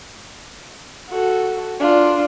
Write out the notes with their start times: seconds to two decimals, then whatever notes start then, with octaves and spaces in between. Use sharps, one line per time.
1.09 F#4 A4
1.80 D4 F4